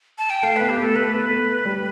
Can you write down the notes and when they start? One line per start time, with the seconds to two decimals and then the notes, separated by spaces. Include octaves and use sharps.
0.18 A5
0.30 G5
0.43 A3 F5
0.56 B3 B4
0.69 G4
0.78 A3 A4
0.96 A3 B4
1.14 B3
1.31 A3
1.65 G3